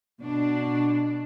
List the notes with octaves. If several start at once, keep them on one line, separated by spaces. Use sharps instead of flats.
B2 D4